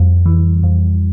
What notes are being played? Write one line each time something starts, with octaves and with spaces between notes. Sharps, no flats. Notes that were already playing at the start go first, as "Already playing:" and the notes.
Already playing: F2 G3
E3
F2